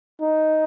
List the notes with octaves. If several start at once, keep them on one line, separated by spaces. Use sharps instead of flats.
D#4